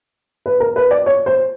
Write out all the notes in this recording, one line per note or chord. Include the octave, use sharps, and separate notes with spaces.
B4
A#4
B4
D5
C#5
C5